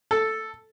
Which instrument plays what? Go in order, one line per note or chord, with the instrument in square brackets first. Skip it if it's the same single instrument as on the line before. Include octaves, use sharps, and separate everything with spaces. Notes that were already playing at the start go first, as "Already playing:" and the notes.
[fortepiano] A4